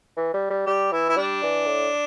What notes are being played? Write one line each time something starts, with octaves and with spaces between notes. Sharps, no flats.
E3
G3
G3
G3 G4
E3 E4
E4
G3 D4
E3
A2